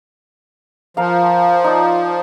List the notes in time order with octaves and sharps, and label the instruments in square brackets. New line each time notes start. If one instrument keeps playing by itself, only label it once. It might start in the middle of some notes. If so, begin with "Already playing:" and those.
[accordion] F3 [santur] A#4 F5
[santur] D#4 D5